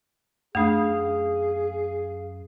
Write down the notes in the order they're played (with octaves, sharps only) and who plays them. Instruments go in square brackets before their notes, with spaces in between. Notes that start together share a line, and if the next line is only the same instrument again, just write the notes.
[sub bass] F#2 [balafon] A3 D4 [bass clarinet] G#4 [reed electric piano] F5 D#6